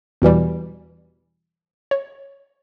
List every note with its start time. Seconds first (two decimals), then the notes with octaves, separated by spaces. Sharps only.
0.22 E2 B2 E3 G3
1.91 C#5